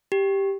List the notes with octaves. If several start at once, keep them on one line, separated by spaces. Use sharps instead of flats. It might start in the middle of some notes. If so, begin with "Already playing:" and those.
G4